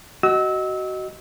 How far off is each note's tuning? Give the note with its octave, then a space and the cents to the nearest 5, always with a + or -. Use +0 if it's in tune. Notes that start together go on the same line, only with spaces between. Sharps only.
F#4 +25 D#5 +0 E6 -25